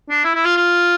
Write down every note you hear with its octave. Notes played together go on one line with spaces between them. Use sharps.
D4
E4
E4
F4
F4